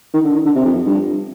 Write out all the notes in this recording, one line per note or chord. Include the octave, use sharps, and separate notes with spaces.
D#3
D3
D#3
D3
C3
F2
F2
G2